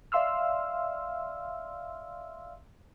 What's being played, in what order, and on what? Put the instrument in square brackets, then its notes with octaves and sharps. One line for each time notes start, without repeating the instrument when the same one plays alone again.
[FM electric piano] D5 E5 F5 C6 E6 F6